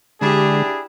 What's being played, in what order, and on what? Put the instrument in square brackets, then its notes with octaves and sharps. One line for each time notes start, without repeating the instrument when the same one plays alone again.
[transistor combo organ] D3 G#3 [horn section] D4 E4 G#4 [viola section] G4